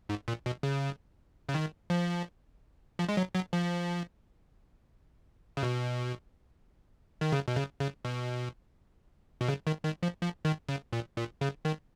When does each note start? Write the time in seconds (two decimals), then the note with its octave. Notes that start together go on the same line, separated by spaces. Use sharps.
0.09 G#2
0.28 A#2
0.46 B2
0.63 C#3
1.49 C#3
1.54 D#3
1.90 F3
2.99 F3
3.09 G#3
3.17 F#3
3.35 F#3
3.53 F3
5.57 C#3
5.63 B2
7.21 D#3
7.32 C#3
7.48 B2
7.56 C#3
7.80 C#3
8.05 B2
9.41 B2
9.48 C#3
9.67 D#3
9.85 D#3
10.03 F3
10.21 F3
10.45 D#3
10.69 C#3
10.93 A#2
11.17 A#2
11.41 C#3
11.65 D#3